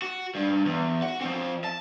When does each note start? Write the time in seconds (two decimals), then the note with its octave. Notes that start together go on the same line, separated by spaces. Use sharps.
0.02 F#4
0.35 G2
0.65 E2
1.02 F#4 F#5
1.21 F3 C4
1.64 A5